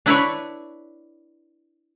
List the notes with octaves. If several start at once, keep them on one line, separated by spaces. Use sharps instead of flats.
D4 E4 B4 C#5